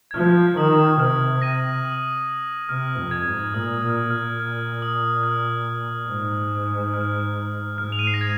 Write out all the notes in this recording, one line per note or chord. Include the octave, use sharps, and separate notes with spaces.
G#6
F3 F6
D#3 D#6
C3 F6
A#6 D#7
D#6
C3 F6
F2
G#6
G#2
A#2 D#6
A#2 F6
A#2 F6
F6
D#6
F6
G#2
F6
G#2 F6
F7
D#7
C7
A#6
G#6